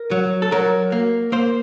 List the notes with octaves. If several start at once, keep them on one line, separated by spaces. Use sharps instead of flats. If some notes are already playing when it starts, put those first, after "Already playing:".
Already playing: A#4
F#3
A4
F#3 A#4
A#3
A#3 C5